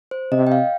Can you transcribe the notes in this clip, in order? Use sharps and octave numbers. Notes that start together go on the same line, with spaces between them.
C5
C3 D#5
G5
F5